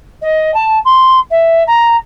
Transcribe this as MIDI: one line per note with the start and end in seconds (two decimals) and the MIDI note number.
0.21 0.53 75
0.54 0.78 81
0.84 1.19 84
1.30 1.63 76
1.67 1.96 82